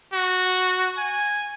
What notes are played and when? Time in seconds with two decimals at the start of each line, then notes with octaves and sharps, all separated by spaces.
0.13 F#4
0.97 G#5